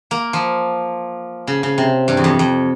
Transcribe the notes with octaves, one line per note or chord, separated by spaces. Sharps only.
A#3
F3
C#3
C#3
C3
G2
E2
F2
F2